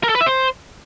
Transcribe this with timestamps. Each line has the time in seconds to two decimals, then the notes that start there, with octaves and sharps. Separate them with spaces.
0.03 A#4
0.09 A4
0.15 B4
0.21 E5
0.26 C5